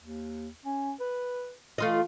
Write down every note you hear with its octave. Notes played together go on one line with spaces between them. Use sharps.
D#2
C#4
B4
E3 A3 F4 D#5